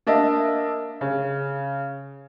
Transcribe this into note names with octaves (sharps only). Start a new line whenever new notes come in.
A#3 D4 D#5 E5
C#3